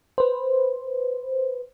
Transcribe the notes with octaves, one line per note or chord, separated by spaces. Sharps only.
B4 C5